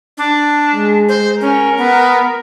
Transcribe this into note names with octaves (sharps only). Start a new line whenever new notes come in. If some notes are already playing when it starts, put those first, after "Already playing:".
D4
G#3
C5
C#4 A#4
B3